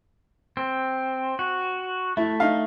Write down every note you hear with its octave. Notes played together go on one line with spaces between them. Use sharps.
C4
F#4
A3 E4
D#4 F5